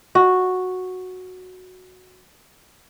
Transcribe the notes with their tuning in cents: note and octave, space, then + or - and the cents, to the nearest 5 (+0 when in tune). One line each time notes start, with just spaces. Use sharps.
F#4 -5